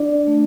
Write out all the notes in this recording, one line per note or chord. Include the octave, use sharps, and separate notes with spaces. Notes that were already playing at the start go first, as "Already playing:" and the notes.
Already playing: D4 D5
A3